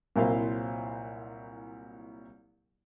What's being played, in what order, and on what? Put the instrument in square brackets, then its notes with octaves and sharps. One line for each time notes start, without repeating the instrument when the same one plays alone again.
[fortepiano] C2 A#2 F#3 E4 C5 F5